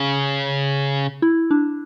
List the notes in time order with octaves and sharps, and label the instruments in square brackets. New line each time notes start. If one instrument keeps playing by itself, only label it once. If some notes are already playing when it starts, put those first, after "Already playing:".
Already playing: [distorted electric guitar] C#3
[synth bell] E4
D4